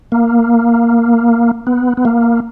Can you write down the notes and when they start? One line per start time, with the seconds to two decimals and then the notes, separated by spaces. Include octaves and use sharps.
0.12 A#3
1.67 B3
1.97 B3
2.05 A#3